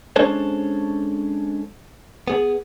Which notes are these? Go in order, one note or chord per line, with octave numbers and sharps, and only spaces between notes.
G#3 C#4 D4 A4 C5 C#5
B3 G#4